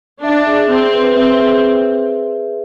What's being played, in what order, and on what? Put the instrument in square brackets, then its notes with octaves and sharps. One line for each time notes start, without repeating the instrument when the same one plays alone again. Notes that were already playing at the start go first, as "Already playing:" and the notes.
[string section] D4 [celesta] E5
[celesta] G#4
[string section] C4 [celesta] G#4
[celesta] B4
[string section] C4 [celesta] E5
[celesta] G#4